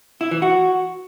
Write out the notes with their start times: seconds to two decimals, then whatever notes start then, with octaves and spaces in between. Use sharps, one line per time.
0.21 E4
0.31 E3
0.42 F#4